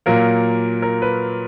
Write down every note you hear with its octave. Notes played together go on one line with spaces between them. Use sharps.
A#2 F#3 A#3 A#4
A#4
B4